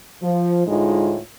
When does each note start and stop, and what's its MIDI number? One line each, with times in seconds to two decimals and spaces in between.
0.22 0.64 53
0.67 1.18 38
0.67 1.18 45
0.67 1.18 56
0.67 1.18 63
0.67 1.18 65